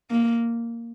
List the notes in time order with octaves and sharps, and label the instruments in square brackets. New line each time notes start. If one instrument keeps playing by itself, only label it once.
[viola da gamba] A#3